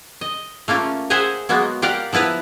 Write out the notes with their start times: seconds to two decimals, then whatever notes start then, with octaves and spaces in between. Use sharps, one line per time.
0.21 D#5
0.68 A3 A#3 C#4 F4
1.10 G#4 C5 E5 F#5 G#5 A#5
1.49 F#3 G#3 A#3 B3 F#4
1.82 G4 A#4 D5 F5 F#5
2.13 F3 B3 E4 B4 A#5